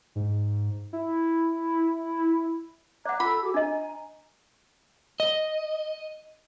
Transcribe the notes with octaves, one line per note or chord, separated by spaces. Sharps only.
G#2
E4
D5 F#5 A#5 D6 F#6
F4 A4 B5 E6
F#4 G#4 D6
D4 D#5 G#5 A#5
D#5